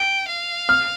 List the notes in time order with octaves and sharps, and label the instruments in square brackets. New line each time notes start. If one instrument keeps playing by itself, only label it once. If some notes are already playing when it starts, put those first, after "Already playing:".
Already playing: [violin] G5
F5
[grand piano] F6